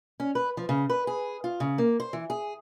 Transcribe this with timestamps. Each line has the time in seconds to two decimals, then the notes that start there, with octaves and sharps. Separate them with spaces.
0.20 C#4
0.35 B4
0.57 F3
0.69 C#3
0.90 B4
1.07 G#4
1.44 F4
1.60 C#3
1.78 A#3
2.00 C5
2.13 E3
2.30 G#4